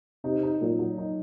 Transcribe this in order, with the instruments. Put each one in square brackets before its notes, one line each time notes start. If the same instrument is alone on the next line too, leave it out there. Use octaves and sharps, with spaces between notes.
[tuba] C3 [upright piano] D#4
[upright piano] D#4
[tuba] A#2 [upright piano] F#3
[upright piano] F#3
D#4